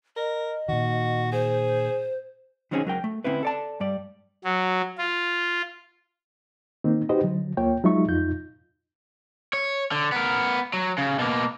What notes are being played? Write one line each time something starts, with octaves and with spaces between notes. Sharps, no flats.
A#4 D#5
A#2 D#3 F#4
G#4 C5
D#3 F#3 C4 C#4 D#4 G#4
C#2 F#3 A#4 G5
A3
D3 C4 C#4 E4 B4
A4 D5 A5
G2 G3 D5
F#3
F4
D#3 A#3 C4 D#4
D#4 F#4 G4 B4 C5 D#5
D3 F#3
D2 A#3 F4 C#5 G5
F#3 G#3 D#4 F4 E5 C#6
F2 D#4 F4 G6
C#5
D3
B3 A#4
F#3
C#3
B2 A#3